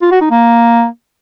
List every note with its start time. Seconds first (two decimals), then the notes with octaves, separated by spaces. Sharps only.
0.02 F4
0.11 F#4
0.21 D#4
0.31 A#3